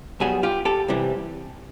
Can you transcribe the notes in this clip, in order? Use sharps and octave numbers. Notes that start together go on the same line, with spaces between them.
B1 B2 G3 F#4 G#4
F4 G4
G4 A4
C2 C3 E3 G3